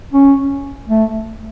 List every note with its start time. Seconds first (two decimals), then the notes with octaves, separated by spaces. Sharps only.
0.13 C#4
0.88 A3